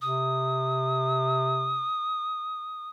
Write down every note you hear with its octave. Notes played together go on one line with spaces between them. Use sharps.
C3 D#6